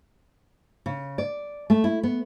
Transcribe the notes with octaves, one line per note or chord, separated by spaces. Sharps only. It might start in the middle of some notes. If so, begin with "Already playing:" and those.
C#3
D5
A3
E4
B3